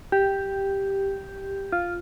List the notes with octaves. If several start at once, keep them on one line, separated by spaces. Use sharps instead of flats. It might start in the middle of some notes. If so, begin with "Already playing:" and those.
G4
F4